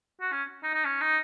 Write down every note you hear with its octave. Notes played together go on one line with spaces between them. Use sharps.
F#4
C#4
D#4
D#4
C#4
D#4